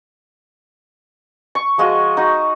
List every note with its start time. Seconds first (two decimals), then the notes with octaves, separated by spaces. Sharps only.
1.55 C#6
1.78 F3 G#3 F4 F#4
2.17 D#4 F#4